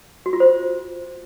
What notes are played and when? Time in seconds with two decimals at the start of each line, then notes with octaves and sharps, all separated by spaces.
0.26 F#4
0.33 F4
0.40 C5